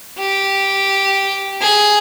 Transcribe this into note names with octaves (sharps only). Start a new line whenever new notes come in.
G4
G#4